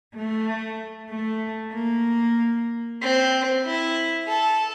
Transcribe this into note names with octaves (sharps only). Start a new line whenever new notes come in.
A3
A3
A#3
C4
E4
A4